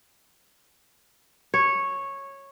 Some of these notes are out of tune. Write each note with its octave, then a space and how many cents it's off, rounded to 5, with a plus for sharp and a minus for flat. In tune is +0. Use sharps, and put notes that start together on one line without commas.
C#5 -10